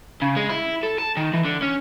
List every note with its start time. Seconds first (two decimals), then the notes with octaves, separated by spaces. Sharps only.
0.22 C#3
0.37 G#3
0.50 E4
0.83 A4
0.99 A5
1.17 D#3
1.34 E3
1.45 D3
1.62 C#4